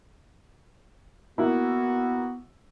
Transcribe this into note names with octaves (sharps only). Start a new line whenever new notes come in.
A#3 B3 E4 F#4